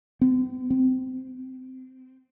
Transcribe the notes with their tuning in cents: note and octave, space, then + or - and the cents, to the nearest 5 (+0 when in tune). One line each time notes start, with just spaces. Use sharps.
C4 -45
C4 -20